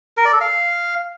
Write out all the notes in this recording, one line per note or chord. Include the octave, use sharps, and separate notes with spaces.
A#4
D5
A4
F5